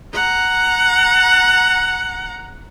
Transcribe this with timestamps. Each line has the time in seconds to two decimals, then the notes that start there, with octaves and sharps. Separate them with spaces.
0.14 F#5 A#5